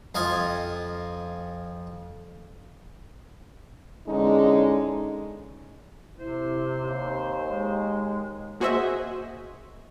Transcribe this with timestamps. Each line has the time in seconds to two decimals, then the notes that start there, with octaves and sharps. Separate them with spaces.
0.15 F2 F4 D#5 G#5
4.07 E2 D3 G#3 C#4 D#4
6.19 C3 E4 C5
6.81 D#2
7.48 G#3
8.60 A#3 F#4 G#4 C5 D#5 E5